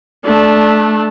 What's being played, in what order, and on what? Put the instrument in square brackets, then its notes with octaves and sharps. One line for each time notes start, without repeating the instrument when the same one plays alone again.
[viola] A3 D4